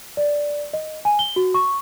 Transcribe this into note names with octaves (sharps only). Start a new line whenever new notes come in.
D5
D#5
G#5
G7
F#4
C#6